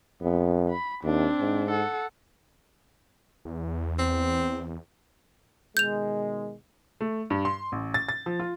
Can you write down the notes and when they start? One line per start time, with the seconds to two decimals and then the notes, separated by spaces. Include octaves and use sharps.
0.22 F2 B3
0.70 B5
1.04 D#2 C4 D4
1.40 G#2
1.71 A4 F#5
3.45 E2
3.99 C4
5.77 B2 D#3 G#3 G6 F7
7.01 A3
7.30 G2
7.45 C6
7.72 A1
7.94 A6
8.09 A6
8.26 F3
8.40 F4